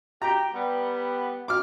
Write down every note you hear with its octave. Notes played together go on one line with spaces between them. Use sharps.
G4 A#5
G3 B3
D6 F6